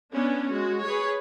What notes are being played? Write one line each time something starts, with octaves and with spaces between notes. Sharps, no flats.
B3 C#4 D4
G#3 F#4
G#4 B4 C#5